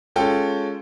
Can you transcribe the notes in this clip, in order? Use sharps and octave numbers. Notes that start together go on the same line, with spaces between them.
G#3 C#4 F4 A4 G5